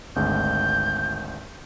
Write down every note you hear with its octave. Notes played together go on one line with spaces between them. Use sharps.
G#1 D2 G#3 G6